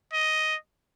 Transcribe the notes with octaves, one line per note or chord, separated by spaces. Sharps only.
D#5